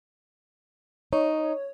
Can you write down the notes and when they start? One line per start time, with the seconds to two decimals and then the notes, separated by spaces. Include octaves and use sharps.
1.13 D#4 C#5